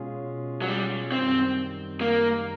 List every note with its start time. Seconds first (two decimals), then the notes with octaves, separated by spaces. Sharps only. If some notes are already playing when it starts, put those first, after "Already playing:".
Already playing: B2 G#3 C#4 F4 G#4
0.62 F#3
0.68 G3
1.12 F#2 D#3 G3 C4
2.01 A#3